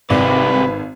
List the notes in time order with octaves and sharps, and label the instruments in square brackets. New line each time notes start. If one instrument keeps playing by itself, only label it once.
[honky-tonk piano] G#1 [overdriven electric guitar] C3 D5 [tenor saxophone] B4